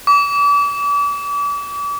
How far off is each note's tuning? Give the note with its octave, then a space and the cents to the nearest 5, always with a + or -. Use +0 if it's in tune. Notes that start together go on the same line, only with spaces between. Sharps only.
D6 -40